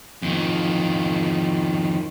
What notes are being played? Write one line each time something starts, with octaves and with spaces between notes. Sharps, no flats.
F2 D#3